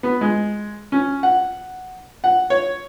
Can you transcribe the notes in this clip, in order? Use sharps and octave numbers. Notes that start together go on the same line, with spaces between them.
B3
G#3
C#4
F#5
F#5
C#5